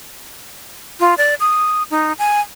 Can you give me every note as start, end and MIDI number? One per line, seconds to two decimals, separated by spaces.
1.00 1.14 65
1.18 1.35 74
1.40 1.83 87
1.90 2.13 63
2.19 2.41 80